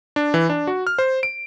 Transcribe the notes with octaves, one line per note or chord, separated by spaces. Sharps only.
D4
E3
D4
F#4
F6
C5
D7